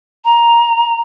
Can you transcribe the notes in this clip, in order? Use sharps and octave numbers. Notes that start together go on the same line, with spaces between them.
A#5